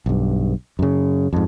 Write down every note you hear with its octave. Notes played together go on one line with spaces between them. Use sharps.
B1 G2
F#2 C#3
F2 G#2